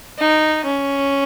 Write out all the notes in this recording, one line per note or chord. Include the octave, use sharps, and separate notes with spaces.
D#4
C#4